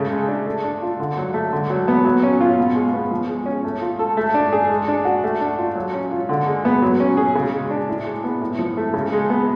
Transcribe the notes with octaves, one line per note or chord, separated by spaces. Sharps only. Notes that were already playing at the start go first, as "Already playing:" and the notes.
Already playing: C#3 A3
G#3
D4
A3
D4
F4
D3
F#3
A3
D3
F#3
B3
F#3
C#4
F4
B2
G#3
B3
F3
G#3
C#4
A3
F4
A4
A3
D4
G#4
G#3
D4
F#4
A3
D4
F4
F#3
C#4
F4
D3
G#3
B3
F#3
C#4
G#4
C#3
G#3
D4
A2
G#3
B3
A2
F3
A3
C#3
G#3
B3